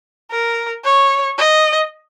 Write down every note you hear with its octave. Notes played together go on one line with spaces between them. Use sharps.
A#4
C#5
D#5